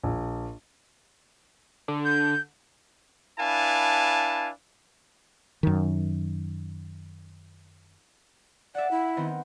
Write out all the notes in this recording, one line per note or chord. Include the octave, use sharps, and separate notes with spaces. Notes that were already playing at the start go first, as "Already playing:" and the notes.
A#1
D3
G6
D4 E4 B4 F5 G#5 A5
F#2 D#3
D5 E5 F#5
E4
D#3 B3 C4